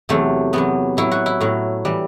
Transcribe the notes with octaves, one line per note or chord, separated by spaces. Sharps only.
E2 C3 F#3 A3
E2 C3 F#3 B3
A2 F#3 E4
F#4
E4
A2 F#3
E3 G3